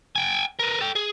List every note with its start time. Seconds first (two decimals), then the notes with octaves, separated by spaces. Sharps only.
0.16 G5 G#5
0.59 A#4 B4
0.80 A4 G5
0.95 G#4